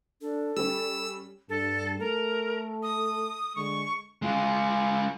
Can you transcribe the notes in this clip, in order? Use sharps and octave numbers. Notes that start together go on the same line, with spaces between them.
D4 A4
G3 C#4 G4 E6
G2 A4
A3 A4 A#4
D#6
D3 G#3 C#6
G#3 F4